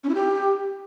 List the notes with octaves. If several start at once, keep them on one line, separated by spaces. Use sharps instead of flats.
C#4
E4
G4